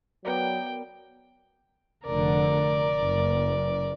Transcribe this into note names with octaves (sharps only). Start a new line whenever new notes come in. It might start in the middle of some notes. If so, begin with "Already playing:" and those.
F#3 B3 A#4 D5 G5
F1 D3 A#4 D5
F#1